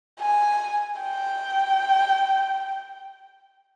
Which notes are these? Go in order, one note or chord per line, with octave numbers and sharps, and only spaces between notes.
G#5
G5